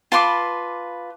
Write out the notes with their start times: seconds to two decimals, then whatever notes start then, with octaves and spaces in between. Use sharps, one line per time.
0.12 F4 B4 A5 B5 C6 D6